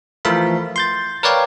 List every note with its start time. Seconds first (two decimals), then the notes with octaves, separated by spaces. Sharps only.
0.25 E3 F3 A3 A#4 F5 B5
0.76 C6 G6 A6
1.23 A#4 B4 C#5 D5 F5 G5